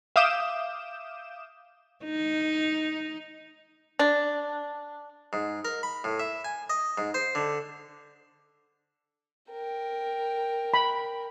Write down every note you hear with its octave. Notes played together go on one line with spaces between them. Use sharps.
E5 F5 D6 D#6 G6 E7
D#4
D4
G#2
A#4
B5
A2
E5
G#5
D#5
G#2
C5
D3
A#4 G5
B5